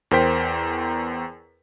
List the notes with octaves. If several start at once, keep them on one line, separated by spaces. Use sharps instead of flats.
E2 A#4 C5 G5 B6